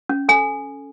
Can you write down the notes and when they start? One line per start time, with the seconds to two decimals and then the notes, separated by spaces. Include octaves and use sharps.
0.09 C#4
0.28 A4 G#5